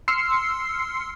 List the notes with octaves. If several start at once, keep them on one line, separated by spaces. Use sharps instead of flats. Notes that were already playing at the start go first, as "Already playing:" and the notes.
C6 E6 F6 C7 C#7